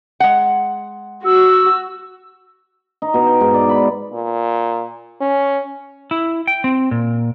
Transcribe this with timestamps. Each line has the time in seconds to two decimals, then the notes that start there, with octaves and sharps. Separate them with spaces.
0.20 G#3 F#5
1.25 F#4 E6
3.02 D#4
3.14 B2
3.26 G5
3.40 G#2
3.54 D5
3.69 B5
4.13 A#2
5.21 C#4
6.11 E4
6.47 G5
6.64 C4
6.91 A#2